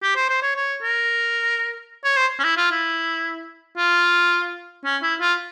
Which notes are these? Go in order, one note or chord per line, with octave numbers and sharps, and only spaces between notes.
G4
C5
C5
C#5
C#5
A#4
C#5
C5
C#4
E4
F4
E4
F4
C#4
E4
F4